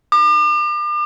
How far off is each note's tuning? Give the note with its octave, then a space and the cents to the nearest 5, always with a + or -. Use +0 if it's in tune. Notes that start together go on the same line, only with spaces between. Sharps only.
D6 +40